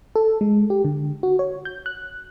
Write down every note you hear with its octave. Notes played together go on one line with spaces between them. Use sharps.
A4
G#3
G4
D3
F#4
C#5
G6
F#6